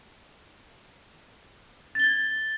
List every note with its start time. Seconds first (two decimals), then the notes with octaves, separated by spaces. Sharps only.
1.95 A6
2.00 G7
2.04 G#6